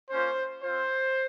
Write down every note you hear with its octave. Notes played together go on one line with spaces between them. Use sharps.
A#3 C#4 F4 C5
C4 F4 C5